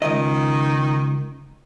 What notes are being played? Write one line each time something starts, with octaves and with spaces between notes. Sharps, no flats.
C#2 D#3 D#5